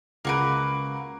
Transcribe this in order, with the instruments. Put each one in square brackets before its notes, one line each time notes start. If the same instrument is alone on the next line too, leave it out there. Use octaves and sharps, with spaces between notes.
[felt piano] C#2 D7 [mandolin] A#3 F#4 B4